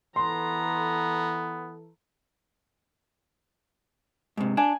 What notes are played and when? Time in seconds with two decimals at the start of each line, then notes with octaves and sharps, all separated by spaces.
0.16 E3 B3 A4 A#5 C6
4.37 G#2 C3
4.57 D4 G#5